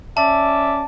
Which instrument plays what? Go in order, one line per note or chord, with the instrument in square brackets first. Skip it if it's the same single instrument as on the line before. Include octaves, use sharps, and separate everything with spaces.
[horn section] C#4 D5 E5 [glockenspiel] A5